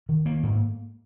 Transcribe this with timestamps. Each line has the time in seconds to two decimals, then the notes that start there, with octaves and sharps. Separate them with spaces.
0.09 D#3
0.26 A#3
0.43 G#2